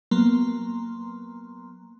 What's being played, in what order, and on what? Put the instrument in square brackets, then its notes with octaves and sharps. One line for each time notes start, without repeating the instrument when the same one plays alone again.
[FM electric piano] F#3 A#3 B3 A#5 C6